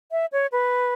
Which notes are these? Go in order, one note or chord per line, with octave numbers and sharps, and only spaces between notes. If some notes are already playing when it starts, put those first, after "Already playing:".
E5
C#5
B4